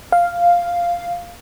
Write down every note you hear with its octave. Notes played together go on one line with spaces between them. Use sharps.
F5